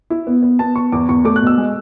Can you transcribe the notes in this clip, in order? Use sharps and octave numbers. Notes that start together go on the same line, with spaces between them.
E4
B3
B3
B3 A5
B3 C#6
E2 D6
E2 C#6
A3 D6
F#6
B2 E6
G#3